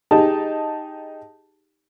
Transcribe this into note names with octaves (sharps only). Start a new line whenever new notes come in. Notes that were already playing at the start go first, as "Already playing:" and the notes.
D#4 G4 G#4 A5